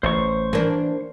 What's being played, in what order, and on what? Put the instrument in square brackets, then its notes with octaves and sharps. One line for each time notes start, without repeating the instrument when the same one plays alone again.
[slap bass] A1 [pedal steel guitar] C5 C#6
[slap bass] E3 [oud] A#3 D4